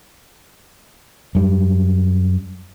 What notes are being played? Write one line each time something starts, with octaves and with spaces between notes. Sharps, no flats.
F#2 G3